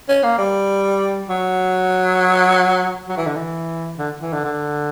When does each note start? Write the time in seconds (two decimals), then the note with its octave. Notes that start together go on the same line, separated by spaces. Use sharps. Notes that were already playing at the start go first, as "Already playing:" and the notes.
0.09 C#4
0.23 A#3
0.38 G3
1.29 F#3
3.09 F#3
3.17 E3
3.26 D3
3.36 E3
3.98 D3
4.21 E3
4.33 D3
4.44 D3